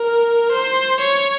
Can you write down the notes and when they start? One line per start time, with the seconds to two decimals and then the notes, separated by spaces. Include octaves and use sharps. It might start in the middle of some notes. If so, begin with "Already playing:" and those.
Already playing: A#4
0.52 C5
1.00 C#5